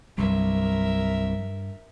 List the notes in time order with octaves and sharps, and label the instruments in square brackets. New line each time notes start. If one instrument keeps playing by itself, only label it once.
[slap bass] C2 [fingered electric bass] G2 [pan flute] F#3 [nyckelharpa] A#4 E5